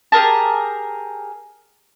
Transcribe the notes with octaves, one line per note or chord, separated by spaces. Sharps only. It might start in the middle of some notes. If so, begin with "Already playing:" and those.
G4 G#4 A#4 A5